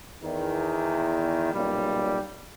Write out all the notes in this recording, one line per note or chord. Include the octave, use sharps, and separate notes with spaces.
E2 D#3
B1 A#2 C#3 G3